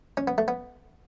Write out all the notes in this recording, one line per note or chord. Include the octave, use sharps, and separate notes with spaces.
C#4
B3
A3
B3